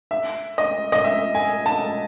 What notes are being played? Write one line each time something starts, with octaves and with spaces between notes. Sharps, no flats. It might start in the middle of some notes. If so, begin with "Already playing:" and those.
E5
D#5
D#5
E5
G#5
A5